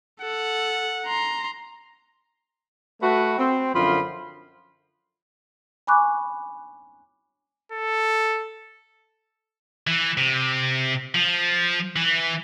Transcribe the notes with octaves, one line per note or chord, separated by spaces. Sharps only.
A4 F#5
A#5 C6
A3 F#4 B4
C4
F#2 D3 F3 F4 B5 C6
G#5 B5 C#6 D6 F#6
A4
E3
C3
F3
E3